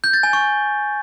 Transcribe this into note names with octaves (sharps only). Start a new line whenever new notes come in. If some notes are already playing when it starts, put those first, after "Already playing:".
G6
A6
G#5
C#6